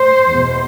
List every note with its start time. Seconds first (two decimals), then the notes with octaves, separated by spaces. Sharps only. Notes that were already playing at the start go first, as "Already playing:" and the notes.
Already playing: C5
0.28 E2 B2